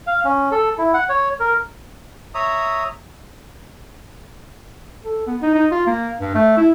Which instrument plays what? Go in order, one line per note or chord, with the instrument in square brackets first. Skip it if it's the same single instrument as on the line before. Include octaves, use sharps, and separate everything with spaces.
[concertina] F5
C#4
A4
E4
F#5
C#5
A#4
[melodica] C#5 E5 A#5 D#6
[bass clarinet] A4
B3
D#4
D#4
F4
A#3
G2
A3
E4